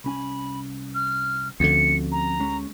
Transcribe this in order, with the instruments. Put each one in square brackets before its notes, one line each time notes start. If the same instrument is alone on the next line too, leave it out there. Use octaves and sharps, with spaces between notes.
[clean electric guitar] C2 C#4 G#5 [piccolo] B5
[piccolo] F6
[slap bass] D2 D3 [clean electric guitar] F3 C4 C#4 [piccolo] C#7
[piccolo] A#5
[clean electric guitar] G#3 C#4